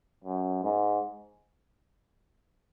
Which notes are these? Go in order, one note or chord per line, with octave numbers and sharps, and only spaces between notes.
F#2
G#2